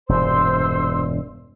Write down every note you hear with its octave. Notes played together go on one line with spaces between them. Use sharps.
E1 G2 A#2 C5 C6 E6